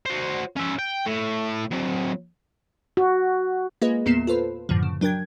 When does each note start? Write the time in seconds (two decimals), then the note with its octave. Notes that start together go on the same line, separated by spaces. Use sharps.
0.05 F#4 C5
0.56 C#4 E5
0.79 G5
1.06 A2
1.71 F#3 C4
2.97 F#4
3.81 G#3 A#3 F4 G#4 B4 D#5
4.06 E2 A#2 A#3 B3 C7 E7
4.27 F4 A4 B4 C5
4.69 F#2 A2 D3 F3
4.83 C#3
5.01 F#3 D4 A#4 G5 G#6